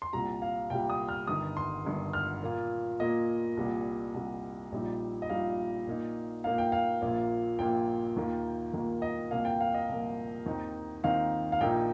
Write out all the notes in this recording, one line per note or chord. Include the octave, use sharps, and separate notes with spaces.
C6
C2 A#2 G3 A#5
F5
C2 A#2 G3 G5
D#6
F6
G1 G2 D#3 D#6
C6
G1 G2 D#3
F6
A#2 A#3 F4
A#2 A#3 F4 D#5
C2 A#2 G3
C2 A#2 G3
A#1 A#2 G3 D#4
D#5
A#1 A#2 G3 D#4 F5
A#2 A#3 D#4
A#2 A#3 D#4 F5
G5
F5
A#1 A#2 A#3 F4
A#1 A#2 A#3 F4 G5
D#2 D#3 A#3 F4
D#2 D#3 A#3 F4
D#5
C2 A#2 F3 A#3 F5
G5
F5
D#5
C2 A#2 F3 A#3
D#2 D#3 C4 D#4
D#2 D#3 C4 D#4 F5
F5
A#1 A#2 A#3 D#4 G5